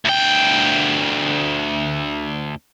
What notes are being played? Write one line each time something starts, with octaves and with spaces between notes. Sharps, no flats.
D2 G5